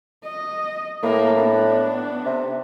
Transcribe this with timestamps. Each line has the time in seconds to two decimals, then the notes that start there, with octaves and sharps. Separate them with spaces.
0.24 D#5
1.03 A2 A#3
1.40 B3 D4
2.26 C3